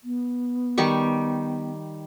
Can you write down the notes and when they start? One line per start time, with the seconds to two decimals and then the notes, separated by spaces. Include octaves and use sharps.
0.04 B3
0.78 D#3 G3 C#6